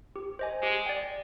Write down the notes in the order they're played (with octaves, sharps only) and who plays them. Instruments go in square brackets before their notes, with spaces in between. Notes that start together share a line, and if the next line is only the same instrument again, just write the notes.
[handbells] G4
C5 D#5 G#5
[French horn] G#3 [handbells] G4
[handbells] D5 G5